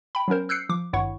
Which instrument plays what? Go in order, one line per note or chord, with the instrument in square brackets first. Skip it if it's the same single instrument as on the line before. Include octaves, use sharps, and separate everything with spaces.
[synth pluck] G5 B5
F#3 B3 C#4 A#4 C5
E6 F#6 G6 C7 C#7
F3 D6
G#1 G2 E4 C#5 F#5 C#6